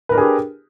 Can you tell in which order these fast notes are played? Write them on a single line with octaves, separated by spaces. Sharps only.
B4 A#4 D4 G#4 G4